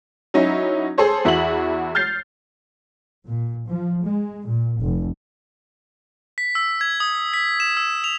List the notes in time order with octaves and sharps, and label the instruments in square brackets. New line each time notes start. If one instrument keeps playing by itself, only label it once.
[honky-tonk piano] F#3 C#4 D#4 E4
G#4 A4 C5 C#5
E2 E4 F#4 G#4 F#7
F6 G6 A6 C7
[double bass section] A#2
F3
G#3
A#2
F1
[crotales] B6
E6
G#6
D#6
B6
E7
E6
F7